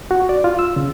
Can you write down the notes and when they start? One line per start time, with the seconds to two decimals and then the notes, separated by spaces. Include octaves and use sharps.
0.11 F#4
0.29 D5
0.44 F4
0.59 E6
0.76 C#3